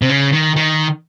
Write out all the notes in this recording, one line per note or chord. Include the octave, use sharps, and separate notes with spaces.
C3
C#3
D#3
D#3